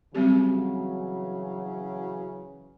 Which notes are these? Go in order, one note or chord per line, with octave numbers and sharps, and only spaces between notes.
C#3 E3 F#3 G3 C4 G4